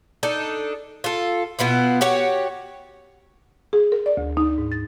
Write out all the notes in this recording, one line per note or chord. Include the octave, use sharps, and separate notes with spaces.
D4 D#4 A4
F4 A4
B2 B3 E4 F4
F#4 G4 C#5
G#4
A#4
D5
D2
D#4
G#2
A6